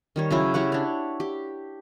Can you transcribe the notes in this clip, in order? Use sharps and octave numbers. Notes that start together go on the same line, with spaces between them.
D#3 G3 C#5
C#3 F#3 E4
E4 G4 C#5 F#5
D4 C#5
G4